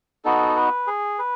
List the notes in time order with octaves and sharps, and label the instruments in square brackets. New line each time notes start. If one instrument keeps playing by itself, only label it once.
[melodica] B3 D#4 F#4 A4
B4
G#4
B4